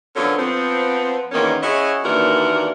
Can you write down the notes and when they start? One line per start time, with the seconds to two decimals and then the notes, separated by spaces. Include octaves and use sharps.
0.16 F#2 D3 F3 F#3 B3 C#4
0.38 F3 B3 C4
1.32 E2 A#2 D#3 A#3 B3 C#4
1.62 C#4 E4 F#4 G#4 D#5
2.04 D#2 A#2 E3 D4 F#4 A#4